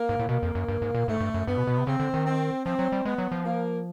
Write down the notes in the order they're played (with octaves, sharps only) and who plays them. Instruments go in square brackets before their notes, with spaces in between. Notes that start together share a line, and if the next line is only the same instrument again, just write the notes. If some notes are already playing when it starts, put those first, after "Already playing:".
Already playing: [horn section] A#3
[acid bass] G#2
A2
[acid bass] B2 [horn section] A#3
[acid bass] F2
F#2
G2
G#2
A#2
[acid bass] G#2 [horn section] A3
[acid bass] G2
F#2
[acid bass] G2 [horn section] B3
[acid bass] B2
B2
C3
[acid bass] C#3 [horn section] C4
[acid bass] D3
D#3
[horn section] C4
[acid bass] F3 [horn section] C4
[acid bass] F#3
G3
[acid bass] G#3 [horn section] B3
[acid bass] F#3
F3
[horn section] A#3